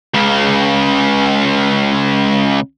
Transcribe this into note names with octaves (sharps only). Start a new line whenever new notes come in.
C#2 C#3